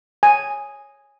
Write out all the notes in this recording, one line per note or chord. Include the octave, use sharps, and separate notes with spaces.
G#5